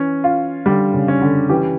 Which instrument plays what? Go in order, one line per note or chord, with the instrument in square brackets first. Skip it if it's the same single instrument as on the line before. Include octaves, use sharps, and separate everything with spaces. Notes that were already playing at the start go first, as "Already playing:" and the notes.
Already playing: [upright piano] E3 [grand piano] C#4
[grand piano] F4
[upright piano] D3 [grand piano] G3
[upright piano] C#3
[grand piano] C#4
[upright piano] D3
[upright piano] E3 [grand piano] G4